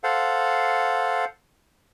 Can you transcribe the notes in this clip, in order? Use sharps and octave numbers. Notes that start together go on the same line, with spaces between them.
A4 C5 F5 F#5